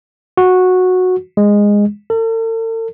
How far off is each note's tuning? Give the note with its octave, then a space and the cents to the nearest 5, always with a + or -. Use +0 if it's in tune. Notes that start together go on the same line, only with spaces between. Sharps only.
F#4 -10
G#3 -15
A4 +45